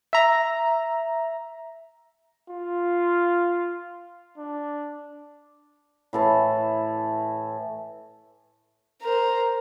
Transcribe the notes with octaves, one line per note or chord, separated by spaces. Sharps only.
E5 A#5
F4
D4
A2 E3 A5
A#4 C5